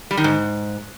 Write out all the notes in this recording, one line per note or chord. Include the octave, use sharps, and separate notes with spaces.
G3
D#3
G#2